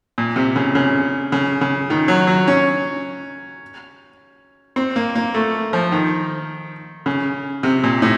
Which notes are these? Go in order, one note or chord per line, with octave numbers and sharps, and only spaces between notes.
A#2
C3
C#3
C#3
C#3
C#3
D#3
F#3
F#3
C#4
C4
A#3
A#3
A3
F3
D#3
C#3
C3
A#2
A2